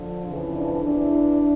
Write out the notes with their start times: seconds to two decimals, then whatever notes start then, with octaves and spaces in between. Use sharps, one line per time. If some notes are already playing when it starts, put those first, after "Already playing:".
Already playing: D3 F3
0.26 F2 C#3 E3
0.55 D4
0.85 E2 E3 D4